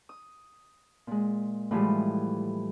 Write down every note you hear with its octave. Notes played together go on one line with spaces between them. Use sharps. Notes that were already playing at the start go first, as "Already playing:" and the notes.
D#6
A#2 G#3
A2 E3 F3 G3 G#3